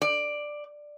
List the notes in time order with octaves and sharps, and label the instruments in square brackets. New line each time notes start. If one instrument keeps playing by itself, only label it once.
[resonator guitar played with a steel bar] D5